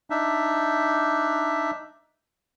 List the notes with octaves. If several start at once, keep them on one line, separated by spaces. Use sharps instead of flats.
D4 D#4 E5